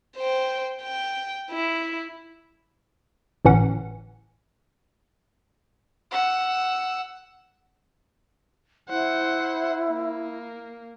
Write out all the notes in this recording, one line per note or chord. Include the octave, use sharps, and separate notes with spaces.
C5 G5
G5
E4
G1 A2 E3 C#4 F#5
F#5 E6
E4 C5 F#5
A#3